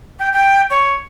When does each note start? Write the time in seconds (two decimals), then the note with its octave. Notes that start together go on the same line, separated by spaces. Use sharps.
0.19 G5
0.32 G5
0.70 C#5